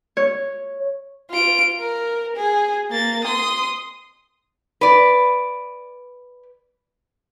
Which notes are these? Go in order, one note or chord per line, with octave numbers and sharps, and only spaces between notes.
C#5
F4 D7
A#4
G#4
A#3 A6
C6 D#6
B4 D5